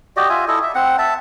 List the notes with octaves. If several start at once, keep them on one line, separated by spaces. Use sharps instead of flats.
F#4 G4 D5 D#5
F4 E5 G#5
E4 A4 D#5
E5
C4 F#5
E5 A5